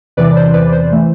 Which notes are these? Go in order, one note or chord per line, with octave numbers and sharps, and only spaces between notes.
E2 C3 E3 B4 D5
D5
C5
B4 D5
C5
E3 A3